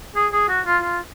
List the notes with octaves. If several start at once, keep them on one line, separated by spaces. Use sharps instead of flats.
G#4
G#4
F#4
F4
F4